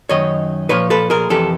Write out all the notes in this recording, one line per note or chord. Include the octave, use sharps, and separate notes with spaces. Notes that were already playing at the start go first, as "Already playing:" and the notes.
F#2 D#3 C#5 D#5
A#2 F3 B4 C#5
A4 B4
G#4 A#4
F2 C3 E3 G4 A4